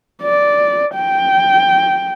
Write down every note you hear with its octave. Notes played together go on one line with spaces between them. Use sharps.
D5
G5